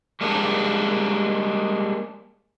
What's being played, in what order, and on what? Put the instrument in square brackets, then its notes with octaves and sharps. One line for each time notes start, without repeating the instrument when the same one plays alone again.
[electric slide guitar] G3 G#3 A#3 D4